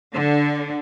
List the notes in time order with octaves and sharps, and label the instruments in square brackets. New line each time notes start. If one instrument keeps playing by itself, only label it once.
[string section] D3